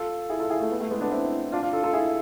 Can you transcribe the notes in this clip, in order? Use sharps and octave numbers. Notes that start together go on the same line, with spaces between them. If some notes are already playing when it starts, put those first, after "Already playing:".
Already playing: F4 A4
E4 G#4
F4 A4
E4 G#4
A3
B3
A3
G#3 B3
B3 D4
C4 E4
D4 F4
D4 F4
F4 A4
F4 A4
E4 G#4